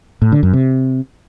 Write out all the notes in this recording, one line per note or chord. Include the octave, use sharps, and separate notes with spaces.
A2
D3
F#2
C3